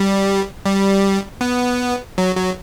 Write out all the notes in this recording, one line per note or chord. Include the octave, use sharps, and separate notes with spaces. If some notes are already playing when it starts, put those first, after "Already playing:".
Already playing: G3
G3
B3
F#3
F#3